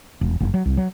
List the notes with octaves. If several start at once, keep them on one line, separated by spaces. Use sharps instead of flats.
E1
F#1
F#3
C2
F#3